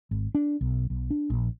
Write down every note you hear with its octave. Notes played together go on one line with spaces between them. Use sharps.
G#1
D4
B1
B1
D4
A#1